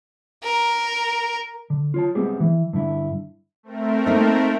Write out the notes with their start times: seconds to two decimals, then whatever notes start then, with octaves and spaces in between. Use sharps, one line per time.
0.43 A#4
1.70 D3
1.94 F4 C#5 A5
2.15 G3 G#3 B3 C4 G4 G#4
2.40 E3
2.73 G2 D3 E4
3.63 A3 C4 A#4
4.06 A#3 D#4